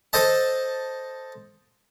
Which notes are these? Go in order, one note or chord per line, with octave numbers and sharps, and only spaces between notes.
A4 C5 D#5 A5